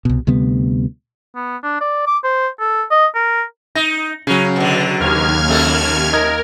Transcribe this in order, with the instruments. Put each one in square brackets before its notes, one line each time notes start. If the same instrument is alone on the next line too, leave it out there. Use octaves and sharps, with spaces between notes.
[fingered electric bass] C2 B2
D2 C3 G3 B3
[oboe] B3
D4
D5
D6
C5
A4
D#5
A#4
[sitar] D#4 [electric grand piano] A#6
[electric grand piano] C#3 F#3 [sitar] C#4
[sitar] B2 D3
[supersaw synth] D#2 F6 G#6
[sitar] F2 A3 A4
[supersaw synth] A#4 [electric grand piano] D#5 G#6